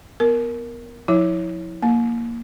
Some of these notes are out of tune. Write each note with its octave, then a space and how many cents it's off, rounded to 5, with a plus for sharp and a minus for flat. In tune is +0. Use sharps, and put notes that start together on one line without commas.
B3 +0 A#4 +0
F3 +30 E4 -20 C#5 +0
A#3 +0 F5 +45